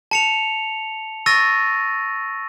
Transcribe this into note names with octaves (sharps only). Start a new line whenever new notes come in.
A5 C#7 F7
C#6 E6 A6 A#6 D#7